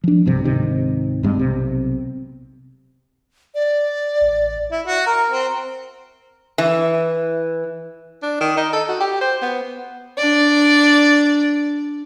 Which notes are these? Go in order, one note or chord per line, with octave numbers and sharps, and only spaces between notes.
F3 D4
B1 G2 C3
C#2 G#2 C3 D#3
F1 G2 G#3 C4
B1 C3
D5
A1
E4
F#4
A#4
C4
E3
D4
D#3
D#4
A4
F#4
G4
C5
B3
D4 D5